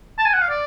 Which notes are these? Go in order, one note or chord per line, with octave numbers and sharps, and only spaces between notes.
A5
G#5
F#5
F5
D5